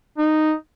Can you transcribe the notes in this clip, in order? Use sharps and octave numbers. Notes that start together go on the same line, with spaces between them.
D#4